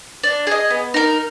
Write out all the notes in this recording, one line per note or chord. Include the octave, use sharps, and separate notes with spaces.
D4
G#4 D#5
B3
D#4 A#4